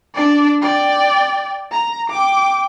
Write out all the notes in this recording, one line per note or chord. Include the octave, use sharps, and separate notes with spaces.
D4 D5
D5 G5
A#5
G5 D6